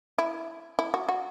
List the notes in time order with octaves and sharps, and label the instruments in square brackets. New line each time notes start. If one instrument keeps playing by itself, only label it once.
[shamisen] E4
E4
F#4
F#4